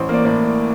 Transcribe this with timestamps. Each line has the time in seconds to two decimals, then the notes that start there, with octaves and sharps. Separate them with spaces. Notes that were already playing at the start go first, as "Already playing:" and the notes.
Already playing: A1 C5
0.09 A#3 D5
0.24 A2 D5